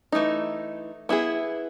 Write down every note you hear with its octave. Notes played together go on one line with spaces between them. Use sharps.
E3 A3 D#4
B3 E4 G#4